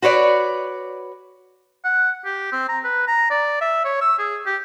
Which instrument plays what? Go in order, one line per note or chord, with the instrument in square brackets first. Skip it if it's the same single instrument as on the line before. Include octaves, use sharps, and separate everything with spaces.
[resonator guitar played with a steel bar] F#4 B4 C#5 D5
[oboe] F#5
G4
C4
A#5
B4
A#5
D5
E5
C#5
E6
G#4
G4